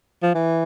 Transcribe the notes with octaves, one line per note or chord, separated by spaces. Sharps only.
F3
E3